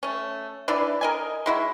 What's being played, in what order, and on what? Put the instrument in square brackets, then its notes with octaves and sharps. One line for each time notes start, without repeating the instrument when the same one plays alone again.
[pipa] A3 C#4
E3 D4 E4 D5
A#4 D#5 G#5
G#3 E4 F#4